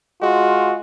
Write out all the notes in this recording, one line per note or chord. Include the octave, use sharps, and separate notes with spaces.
G#3 F4 F#4